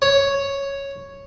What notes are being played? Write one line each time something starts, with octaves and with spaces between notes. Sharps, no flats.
C#5